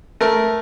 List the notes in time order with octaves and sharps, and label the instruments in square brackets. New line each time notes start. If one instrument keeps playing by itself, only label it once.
[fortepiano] A3 A#4